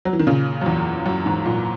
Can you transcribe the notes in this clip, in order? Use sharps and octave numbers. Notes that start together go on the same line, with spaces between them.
F#3
E3
D#3
A#2 C#3
F#2
E2
F#2
E2 G#2
F#2 A#2